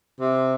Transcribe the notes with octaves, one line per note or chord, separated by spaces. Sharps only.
C3